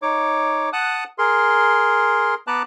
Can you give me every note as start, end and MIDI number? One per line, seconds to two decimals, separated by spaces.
0.02 0.70 63
0.02 0.70 73
0.02 0.70 86
0.73 1.04 78
0.73 1.04 81
0.73 1.04 87
0.73 1.04 90
1.18 2.35 68
1.18 2.35 70
1.18 2.35 84
2.47 2.63 59
2.47 2.63 71
2.47 2.63 81
2.47 2.63 82
2.47 2.63 86
2.47 2.63 90